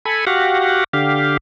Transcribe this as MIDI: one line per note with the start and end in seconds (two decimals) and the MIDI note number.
0.05 0.25 69
0.05 0.25 80
0.05 0.25 83
0.27 0.84 66
0.27 0.84 67
0.27 0.84 77
0.27 0.84 78
0.93 1.37 50
0.93 1.37 67
0.93 1.37 77